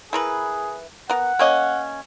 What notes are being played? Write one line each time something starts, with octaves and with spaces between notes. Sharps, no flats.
E3 G#4 A#4 B4
B3 A#4 F#5
A#3 C#4 D#5